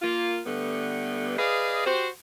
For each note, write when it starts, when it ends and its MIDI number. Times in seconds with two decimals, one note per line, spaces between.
0.02 0.41 58
0.02 0.41 65
0.46 1.38 50
0.46 1.38 55
0.46 1.38 57
0.46 1.38 59
1.38 1.83 68
1.38 1.83 71
1.38 1.83 74
1.38 1.83 75
1.38 1.83 77
1.86 2.07 66
1.86 2.07 67
1.86 2.07 72